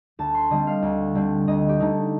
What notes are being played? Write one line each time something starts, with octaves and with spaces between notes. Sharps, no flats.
D2 A5
C6
D3 G3 C4 D#5
F5
D2
D3 G3 C4
D2 D#5
G4
D3 A3 D#4